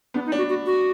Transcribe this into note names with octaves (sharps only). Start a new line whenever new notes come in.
B3 D4
D#4
D4
F#4
F#4
F#4